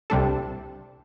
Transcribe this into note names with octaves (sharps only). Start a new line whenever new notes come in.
C2 C3 G3 D4 A4